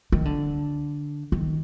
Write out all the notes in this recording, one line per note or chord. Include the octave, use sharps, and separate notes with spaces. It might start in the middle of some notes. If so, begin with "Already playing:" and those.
D#3
D3
D#3